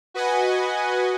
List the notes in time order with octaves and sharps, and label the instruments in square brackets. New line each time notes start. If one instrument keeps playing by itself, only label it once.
[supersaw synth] F#4 B4 D#5 F#5 G#5